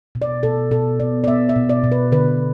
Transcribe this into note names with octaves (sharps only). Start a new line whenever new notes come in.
B2
D5
B2 A4
B2 A4
B3 D5
D5
B3 E5
E5
B2
D5
B2
B4
D3 B4